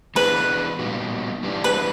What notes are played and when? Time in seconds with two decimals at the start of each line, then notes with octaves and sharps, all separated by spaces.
0.15 E3 G#3 B3 D4 B4
0.79 A#2 G3 B3 D#4 F#4
1.43 E3 G3 B3 D4
1.64 B4